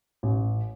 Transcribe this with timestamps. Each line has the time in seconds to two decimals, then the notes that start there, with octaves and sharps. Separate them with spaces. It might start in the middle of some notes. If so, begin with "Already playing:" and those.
0.23 A1